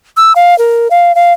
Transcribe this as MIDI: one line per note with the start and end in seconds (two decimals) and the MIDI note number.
0.17 0.33 88
0.36 0.57 77
0.58 0.88 70
0.91 1.15 77
1.15 1.33 77